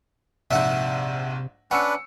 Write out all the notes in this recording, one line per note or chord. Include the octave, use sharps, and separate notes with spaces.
A#1 G#2 C3 E5 F#5
C#4 D4 B4 F#5 E6 C#7